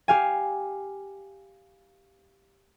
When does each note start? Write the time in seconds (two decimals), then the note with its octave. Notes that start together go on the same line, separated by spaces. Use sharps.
0.08 G4 F5 G#5